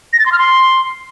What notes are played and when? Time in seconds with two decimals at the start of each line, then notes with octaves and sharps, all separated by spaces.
0.13 A#6
0.19 A6
0.26 C6
0.32 F6
0.38 C6